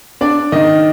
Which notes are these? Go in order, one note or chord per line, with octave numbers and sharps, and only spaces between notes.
D4 D5
D#3 D#5